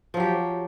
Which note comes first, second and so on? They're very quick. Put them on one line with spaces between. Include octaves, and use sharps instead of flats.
F3 F#3 G4